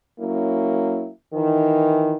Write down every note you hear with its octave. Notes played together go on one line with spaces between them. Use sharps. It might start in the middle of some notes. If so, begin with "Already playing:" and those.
F#3 A#3 C#4 E4
D#3 E3